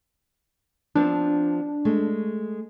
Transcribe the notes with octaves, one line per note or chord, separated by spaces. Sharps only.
F3 B3 C4 D4
G#3 A3